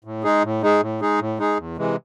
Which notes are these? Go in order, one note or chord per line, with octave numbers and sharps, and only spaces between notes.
A2
G#3 D#4 G#4
A2
G#3 D#4 G#4
A2
G#3 D#4 G#4
A2
G#3 D#4 G#4
E2
C3 E3 G#3